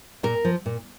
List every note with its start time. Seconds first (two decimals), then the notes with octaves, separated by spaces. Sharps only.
0.23 A#2 A#4
0.45 F3
0.66 A#2